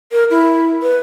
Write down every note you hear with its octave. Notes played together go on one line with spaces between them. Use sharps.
A#4
E4
B4